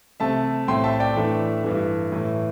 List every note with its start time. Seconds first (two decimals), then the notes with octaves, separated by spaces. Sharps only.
0.20 C3 A3 C4 E5 A5
0.68 A2 A3 C4 G5 C6
0.84 E5 A5
1.00 D5 G5
1.16 A2 E3 A3 D4 E5
1.64 G2 E3 A3
2.12 A2 E3 A3